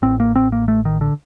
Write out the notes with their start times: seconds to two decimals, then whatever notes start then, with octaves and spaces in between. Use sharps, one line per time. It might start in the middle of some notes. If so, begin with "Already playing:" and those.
0.02 A1 A2 C4
0.20 A#3
0.36 C4
0.52 A#3
0.68 A3
0.85 D#3
1.01 D3